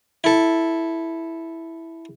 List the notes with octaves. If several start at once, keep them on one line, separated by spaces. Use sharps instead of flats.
E4 A4